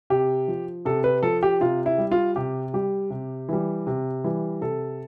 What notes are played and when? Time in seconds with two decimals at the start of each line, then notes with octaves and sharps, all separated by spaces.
0.10 C3 G4
0.48 F3
0.85 C3 A4
1.04 B4
1.23 F3 A4
1.43 G4
1.61 C3 F4
1.86 E4
1.98 G3
2.11 F4
2.36 C3 G4
2.74 G3 G4
3.10 C3
3.49 E3 G3
3.87 C3
4.24 E3 G3
4.61 C3 A4